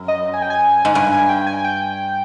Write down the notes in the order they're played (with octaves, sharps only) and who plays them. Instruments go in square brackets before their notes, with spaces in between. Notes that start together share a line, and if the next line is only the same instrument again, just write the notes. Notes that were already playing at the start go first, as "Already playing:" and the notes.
Already playing: [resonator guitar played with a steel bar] F#2
[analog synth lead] D#5
G#5
G5
G#5
[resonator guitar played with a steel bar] G#2
[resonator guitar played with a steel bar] G2 [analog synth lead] G#5
[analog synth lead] G#5
G5
G#5
G5